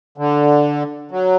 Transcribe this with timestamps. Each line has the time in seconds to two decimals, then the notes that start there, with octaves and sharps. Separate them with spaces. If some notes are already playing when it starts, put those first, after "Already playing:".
0.18 D3
1.11 F#3